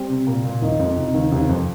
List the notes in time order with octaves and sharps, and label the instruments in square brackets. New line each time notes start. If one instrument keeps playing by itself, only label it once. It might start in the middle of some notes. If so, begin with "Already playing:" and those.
Already playing: [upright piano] G3 C4
[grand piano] C3
[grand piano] A#2 [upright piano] A#3
[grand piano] A#2
[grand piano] D#2 D#3 [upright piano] D#4
[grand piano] F2 F3
[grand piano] C3 [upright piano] D#4
[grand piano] C3
D#2 D#3
[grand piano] D#2 D#3 [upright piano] C3
[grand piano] F2 F3